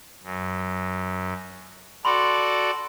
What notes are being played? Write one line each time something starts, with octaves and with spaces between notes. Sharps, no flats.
F#2
F#4 A4 D5 B5 C6